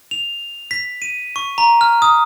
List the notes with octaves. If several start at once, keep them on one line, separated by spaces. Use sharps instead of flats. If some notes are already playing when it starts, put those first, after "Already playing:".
F7
B6
D#7
C#6
A#5
F6
D#6